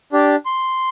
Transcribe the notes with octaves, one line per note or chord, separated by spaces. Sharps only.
D4 G4
C6